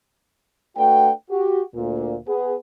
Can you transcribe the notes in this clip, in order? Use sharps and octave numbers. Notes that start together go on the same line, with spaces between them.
A3 D4 F#4 B4 F#5 G5
F#4 G4
D2 A#2
B3 G#4